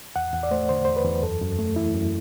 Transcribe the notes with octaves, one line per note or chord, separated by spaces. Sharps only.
E2 F#5
E2 F#5
D5
A3 C5
D3 C5
E2 C5
B4
E2
F#2 A4
F#2
A3
E3 E4
F#2